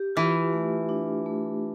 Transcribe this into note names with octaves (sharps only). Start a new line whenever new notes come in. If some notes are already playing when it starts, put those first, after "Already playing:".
Already playing: G4
E3 F4
A3
D4
A3